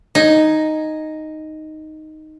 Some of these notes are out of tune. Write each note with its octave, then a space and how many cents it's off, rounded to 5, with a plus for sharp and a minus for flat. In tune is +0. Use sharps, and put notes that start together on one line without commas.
D#4 +0 G#5 +0